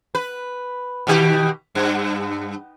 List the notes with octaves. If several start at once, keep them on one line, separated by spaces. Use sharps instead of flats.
B4
B2 D#3 G4
G2